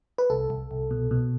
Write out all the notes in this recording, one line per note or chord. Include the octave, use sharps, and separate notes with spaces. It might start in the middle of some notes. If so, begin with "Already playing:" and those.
B4
C2 A4
C2
C2
B2
B2